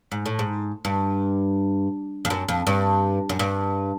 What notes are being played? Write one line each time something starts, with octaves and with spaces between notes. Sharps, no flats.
G#2
A2
G#2
G2
F2
F#2
F2
G2
F#2
G2